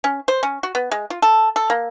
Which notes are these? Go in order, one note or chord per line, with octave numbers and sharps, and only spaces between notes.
C#4
C5
C#4
F#4
B3
G#3
F4
A4
A4
A#3